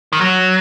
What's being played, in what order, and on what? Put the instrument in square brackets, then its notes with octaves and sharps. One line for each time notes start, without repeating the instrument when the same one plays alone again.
[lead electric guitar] D#3
F#3